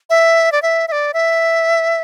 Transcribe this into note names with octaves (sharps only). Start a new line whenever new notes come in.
E5
D5
E5
E5
D5
E5